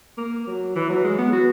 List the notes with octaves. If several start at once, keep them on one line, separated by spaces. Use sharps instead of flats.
A#3
F#3
E3
F#3
G#3
B3
F#4